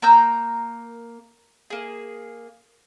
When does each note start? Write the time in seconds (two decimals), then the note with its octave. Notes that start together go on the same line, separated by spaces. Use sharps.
0.02 A#3 A#5 E6 G6
1.70 A#3 G#4